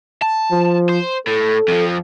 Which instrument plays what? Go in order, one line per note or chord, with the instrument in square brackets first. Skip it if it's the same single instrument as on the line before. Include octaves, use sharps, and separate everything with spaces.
[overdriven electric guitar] A5
[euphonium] F3
[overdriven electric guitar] C5
[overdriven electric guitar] A2 [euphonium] A4
[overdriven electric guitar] F2 F3